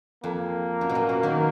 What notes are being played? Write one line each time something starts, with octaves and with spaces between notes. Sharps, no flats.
F2 A#3
F#2
B2
A#2
B2
D#3 F#3